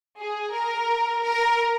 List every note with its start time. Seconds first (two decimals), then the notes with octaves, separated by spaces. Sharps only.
0.19 G#4
0.53 A#4
1.23 A#4